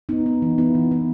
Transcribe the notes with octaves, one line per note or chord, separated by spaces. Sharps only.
B3 D#4
B3
E3
B3 E4
E3
B3